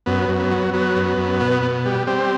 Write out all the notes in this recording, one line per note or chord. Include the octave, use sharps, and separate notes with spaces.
F#2 B3
F#2
B3
F#3
F#3 B3
F#2
F#2
B2
B2
G3
G3 C4